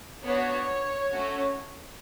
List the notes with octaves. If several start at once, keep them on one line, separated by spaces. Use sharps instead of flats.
B3 D4 F#4 C#5
A3 C#4 F#4